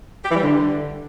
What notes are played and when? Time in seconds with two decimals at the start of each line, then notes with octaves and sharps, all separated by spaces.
0.24 G4
0.30 E3
0.36 G3
0.42 D3